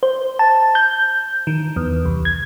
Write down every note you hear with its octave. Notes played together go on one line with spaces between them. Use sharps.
C5
A5
G6
D#3
E2
C2
G#6